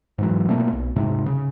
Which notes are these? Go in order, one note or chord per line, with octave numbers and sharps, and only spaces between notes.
G#2 E3 F#3
B2 A3 A#3 C4
B1
D#1 G#2 C3
C#3